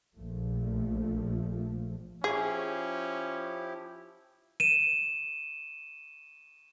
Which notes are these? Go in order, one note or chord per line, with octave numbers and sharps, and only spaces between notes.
A#1 F3 A3
F3 C#4 E4 G4 G#4
D#7 E7